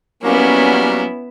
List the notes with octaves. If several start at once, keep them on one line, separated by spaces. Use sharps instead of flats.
F#3 G3 A#3 B3 C#4 E4